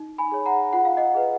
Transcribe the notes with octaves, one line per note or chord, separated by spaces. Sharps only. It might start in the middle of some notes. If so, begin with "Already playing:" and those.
Already playing: D#4
G#5 B5
G#4 C#5
F#5 A#5
F4 F#5
F5
D#5 F#5
G#4 B4